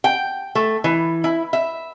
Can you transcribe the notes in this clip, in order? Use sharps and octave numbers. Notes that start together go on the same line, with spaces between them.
G5
A3
E3
E4
E5